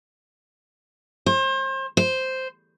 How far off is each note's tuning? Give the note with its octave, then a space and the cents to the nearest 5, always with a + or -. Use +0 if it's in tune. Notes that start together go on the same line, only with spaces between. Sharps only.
C5 +35
C5 -5